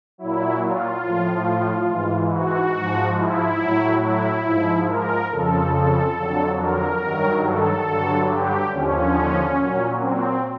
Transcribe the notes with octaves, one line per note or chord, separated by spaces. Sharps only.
A#2 F#3 E4
F4
A2 F3
G#2 E3
F#4
G#2 F3
E4
A2 F#3
E4
G#2 F3
A#4
F2 C#3 F3 A4
A4
F2 D3 F#3
A#4
G2 D#3 F#3
A4
G2 D3 F#3
G4
D#2 D3 F3 C#4
A#2 F#3
C4